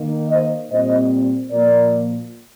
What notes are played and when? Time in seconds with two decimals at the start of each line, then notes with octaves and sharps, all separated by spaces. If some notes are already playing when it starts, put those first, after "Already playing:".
Already playing: D#3 A#3
0.30 C5 D#5
0.70 A#2 G3 C4 C5 D#5
1.52 A#2 F3 A#3 A#4 D5